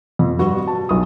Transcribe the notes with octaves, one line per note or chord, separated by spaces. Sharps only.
F2
G2 F#4
A5
B1 D#6